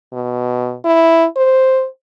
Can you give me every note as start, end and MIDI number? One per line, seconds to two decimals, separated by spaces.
0.13 0.75 47
0.85 1.26 64
1.37 1.87 72